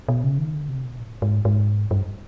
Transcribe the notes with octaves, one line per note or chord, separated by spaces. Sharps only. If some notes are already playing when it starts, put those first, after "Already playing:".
B2
C#3
D#3
D3
C3
B2
A2
G#2
G#2
G2